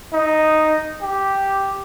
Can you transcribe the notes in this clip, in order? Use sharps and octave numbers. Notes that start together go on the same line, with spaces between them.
D#4
G4